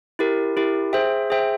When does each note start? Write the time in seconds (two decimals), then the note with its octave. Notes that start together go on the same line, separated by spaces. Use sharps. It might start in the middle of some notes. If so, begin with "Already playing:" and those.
0.19 E4 G4 A#4
0.57 E4 G4 A#4
0.93 G#4 C5 E5 G5
1.30 G#4 C5 E5 G5